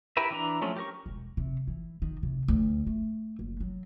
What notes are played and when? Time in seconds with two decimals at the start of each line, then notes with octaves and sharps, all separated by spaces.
0.17 E4 G4 A#4 B4 E5
0.31 E3 D4 A#5
0.61 F3 F#3 A3 C#4
0.77 G4 A#4 C#6
1.06 E1
1.37 C3
1.67 E3
2.02 D#3
2.23 C3
2.48 D2
2.87 A3
3.39 F#1
3.60 F#3